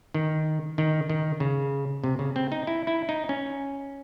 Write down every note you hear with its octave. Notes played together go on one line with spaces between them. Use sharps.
D#3
D#3
D#3
C#3
C3
C#3
C4
D#4
E4
E4
D#4
C#4